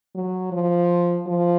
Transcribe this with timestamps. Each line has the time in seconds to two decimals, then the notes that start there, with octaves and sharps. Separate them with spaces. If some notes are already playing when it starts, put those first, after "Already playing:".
0.15 F#3
0.52 F3
1.27 F3